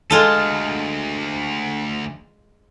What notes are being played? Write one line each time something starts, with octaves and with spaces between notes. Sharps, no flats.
D2 G#3 F4 A4 A5